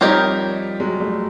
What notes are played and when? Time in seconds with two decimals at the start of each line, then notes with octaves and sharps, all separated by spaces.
0.01 F3 G3 C4 D#4 G4 A#4 C#5
0.80 F#3 G#3
1.00 G3 A3